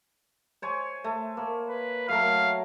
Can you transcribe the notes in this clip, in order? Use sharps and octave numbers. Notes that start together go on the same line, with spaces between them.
C5 C#5 G#5
A3
A#3
B4
F#3 A3 A#4 F5